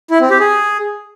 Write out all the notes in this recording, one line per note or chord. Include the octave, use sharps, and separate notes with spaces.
E4
C4
G4
G#4